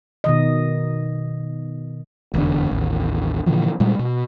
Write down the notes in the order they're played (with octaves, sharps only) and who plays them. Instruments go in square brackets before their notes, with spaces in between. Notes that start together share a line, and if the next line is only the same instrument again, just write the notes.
[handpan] B2 D#3 D#5
[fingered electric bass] F1 E2 A2 D3
A1 D#2
A#2 D3 E3 F3
A#2 G3 G#3
B2